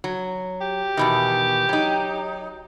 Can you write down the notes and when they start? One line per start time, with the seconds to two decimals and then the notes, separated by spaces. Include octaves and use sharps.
0.04 F#3
0.61 G4
0.97 E2 B2 D#3
1.69 F#3 D#4